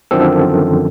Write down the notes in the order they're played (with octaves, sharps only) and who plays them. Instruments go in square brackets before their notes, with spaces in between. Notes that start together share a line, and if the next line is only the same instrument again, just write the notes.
[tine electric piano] F#2 D3 D#3 F3 C4 A4